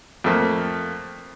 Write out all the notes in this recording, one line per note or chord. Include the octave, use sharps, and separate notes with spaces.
F2 A3 A#3